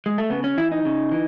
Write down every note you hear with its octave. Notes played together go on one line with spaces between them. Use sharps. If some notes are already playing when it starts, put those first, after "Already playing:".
G#3
A3
C#3 B3
C#4
E3 E4
D#4
C#3
E3